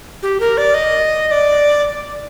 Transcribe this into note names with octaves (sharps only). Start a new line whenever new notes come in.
G4
A#4
D5
D#5
D#5
D5